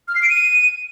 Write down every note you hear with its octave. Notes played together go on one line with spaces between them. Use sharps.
F6
C7
D7
D#7